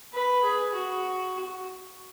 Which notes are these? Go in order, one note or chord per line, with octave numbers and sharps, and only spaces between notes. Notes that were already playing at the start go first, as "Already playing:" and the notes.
B4
G#4
F#4